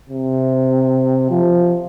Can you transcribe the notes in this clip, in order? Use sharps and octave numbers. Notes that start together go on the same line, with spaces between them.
C3
F3